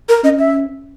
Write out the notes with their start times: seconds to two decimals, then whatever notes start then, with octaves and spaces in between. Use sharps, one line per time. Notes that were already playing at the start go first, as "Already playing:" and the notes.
0.09 A#4
0.24 C#4 D#5
0.39 E5